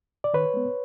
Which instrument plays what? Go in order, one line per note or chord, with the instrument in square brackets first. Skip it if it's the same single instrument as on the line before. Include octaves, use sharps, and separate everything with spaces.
[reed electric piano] D5
D#3 B4 C#5
G#3 B3